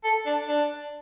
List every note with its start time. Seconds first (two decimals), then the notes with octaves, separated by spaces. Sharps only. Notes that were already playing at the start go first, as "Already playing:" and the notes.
0.04 A4
0.26 D4
0.48 D4